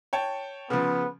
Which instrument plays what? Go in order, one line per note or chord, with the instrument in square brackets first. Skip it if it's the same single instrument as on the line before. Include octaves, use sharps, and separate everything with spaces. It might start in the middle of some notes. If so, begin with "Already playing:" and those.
[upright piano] C#5 G5 A5
[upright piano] C#3 F3 [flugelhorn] B3